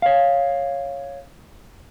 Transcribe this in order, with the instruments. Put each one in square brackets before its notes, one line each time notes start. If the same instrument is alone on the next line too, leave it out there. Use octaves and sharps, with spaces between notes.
[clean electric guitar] C#5 F5